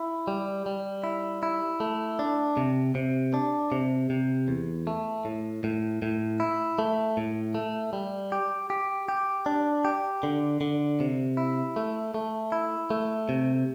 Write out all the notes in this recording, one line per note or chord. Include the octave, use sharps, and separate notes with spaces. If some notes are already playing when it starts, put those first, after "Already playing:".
Already playing: E4
G3
G3
E4
E4
A3
D4
C3
C3
D4
C3
C3
E2
A3
A2
A2
A2
E4
A3
A2
A3
G3
G4
G4
G4
D4
G4
D3
D3
C3
E4
A3
A3
E4
A3
C3